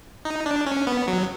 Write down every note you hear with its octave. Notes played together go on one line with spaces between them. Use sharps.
D#4
D4
C#4
B3
F#3